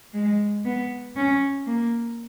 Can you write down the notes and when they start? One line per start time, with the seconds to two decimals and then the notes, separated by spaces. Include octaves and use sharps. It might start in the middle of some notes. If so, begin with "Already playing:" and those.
0.14 G#3
0.65 B3
1.16 C#4
1.67 A#3